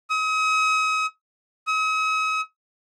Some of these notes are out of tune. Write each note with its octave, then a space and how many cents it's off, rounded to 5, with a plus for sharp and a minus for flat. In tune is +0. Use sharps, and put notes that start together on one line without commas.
D#6 +40
D#6 +45